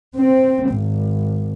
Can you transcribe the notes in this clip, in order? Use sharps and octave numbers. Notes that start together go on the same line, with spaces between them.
C4
G#1